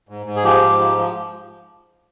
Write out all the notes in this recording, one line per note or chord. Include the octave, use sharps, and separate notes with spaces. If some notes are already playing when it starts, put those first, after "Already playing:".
G#2
G#2
G#4
F3 G4
G#2
F3
F3